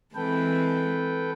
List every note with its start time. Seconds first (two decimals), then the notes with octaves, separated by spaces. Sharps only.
0.15 E3 G#3 C4 A4 B4 G5